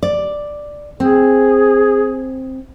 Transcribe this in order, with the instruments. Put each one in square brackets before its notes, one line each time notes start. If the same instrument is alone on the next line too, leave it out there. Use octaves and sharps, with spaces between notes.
[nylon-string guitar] D5
[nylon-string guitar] C4 [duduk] G#4